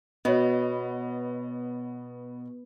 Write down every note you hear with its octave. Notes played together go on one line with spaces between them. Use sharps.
B2 B3 C#5 D#5